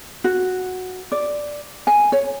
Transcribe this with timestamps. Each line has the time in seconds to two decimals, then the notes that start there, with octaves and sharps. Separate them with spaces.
0.24 F#4
1.12 D5
1.87 G#5
2.12 C#5